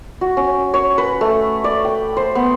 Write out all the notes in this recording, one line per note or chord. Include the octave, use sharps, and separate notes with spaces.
F#4
C#4
C#5
B4
A3
D5
G5
C5
B3